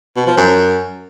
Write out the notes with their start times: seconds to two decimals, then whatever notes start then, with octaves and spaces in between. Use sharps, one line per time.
0.16 B2
0.26 F3
0.37 F#2